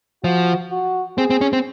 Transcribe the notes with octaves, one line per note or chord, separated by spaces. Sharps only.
F3 F#4
F#4
C4 G#4
C4
C#4
C4